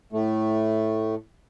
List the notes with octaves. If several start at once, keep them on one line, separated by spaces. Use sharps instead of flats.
A2 A3